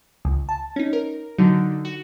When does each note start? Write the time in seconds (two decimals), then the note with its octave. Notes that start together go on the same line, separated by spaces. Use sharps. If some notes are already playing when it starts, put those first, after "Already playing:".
0.25 C#2
0.49 A5
0.76 C#4 D#4
0.93 A#4
1.38 D3 F#3 D#4
1.85 F#4